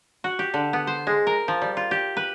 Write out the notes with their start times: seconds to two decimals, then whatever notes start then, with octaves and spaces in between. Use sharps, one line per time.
0.24 F#4
0.39 G4
0.54 D3
0.73 B3
0.87 C5
1.07 G#3
1.27 A#4
1.48 F3
1.62 G3
1.77 F4
1.91 G4
2.17 B4